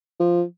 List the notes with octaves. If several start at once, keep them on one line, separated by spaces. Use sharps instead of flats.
F3